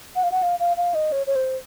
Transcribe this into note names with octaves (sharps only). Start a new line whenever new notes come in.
F#5
F5
F#5
F5
F5
F5
D#5
C#5
C#5
C5